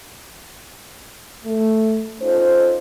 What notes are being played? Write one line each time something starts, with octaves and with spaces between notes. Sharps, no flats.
A3
C#4 D#4 F4 A4 C5